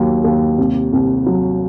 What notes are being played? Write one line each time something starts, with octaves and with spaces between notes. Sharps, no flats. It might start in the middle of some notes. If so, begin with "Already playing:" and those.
Already playing: D#2 F#3
D#2
C2
C2
F#3